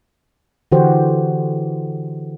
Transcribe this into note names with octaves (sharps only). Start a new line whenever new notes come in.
D3 E3 F#4 G4 C5